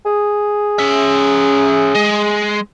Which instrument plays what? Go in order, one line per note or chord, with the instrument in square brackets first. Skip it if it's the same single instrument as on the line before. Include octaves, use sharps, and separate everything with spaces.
[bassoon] G#4
[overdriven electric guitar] C#4 E5
G#3